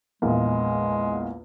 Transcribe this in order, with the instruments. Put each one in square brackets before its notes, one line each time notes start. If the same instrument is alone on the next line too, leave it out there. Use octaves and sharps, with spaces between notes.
[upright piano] A#1 E2 A#3 [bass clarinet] G#3